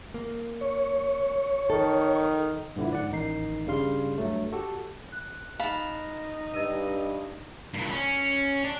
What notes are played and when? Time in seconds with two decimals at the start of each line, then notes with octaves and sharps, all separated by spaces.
0.14 A#3
0.61 C#5
1.70 D#3 A4
2.76 G2 A#2 D3 F3 E4
2.91 G#2 D5 F#5
3.11 A1 D#3 D#4 C7
3.66 G2 C#3 G3 F5 C6
4.18 G2 F#3 A3
4.52 F#4 G4 A4
5.12 F#6
5.59 D#4 F5 A5 B5
6.54 G2 D#5 E6 D#7
7.74 G2 A#2
7.92 C#4
8.64 D4